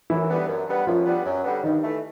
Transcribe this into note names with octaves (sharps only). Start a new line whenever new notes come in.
F#2 E3 E4
D3 G3 B3
F#2
D3 G3 B3
F#2 F3 F4
D3 G3 B3
F#2
D3 G3 B3
G2 D#3 D#4
E3 A3